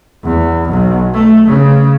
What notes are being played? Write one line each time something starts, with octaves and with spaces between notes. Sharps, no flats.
E2
B1
A3
C#3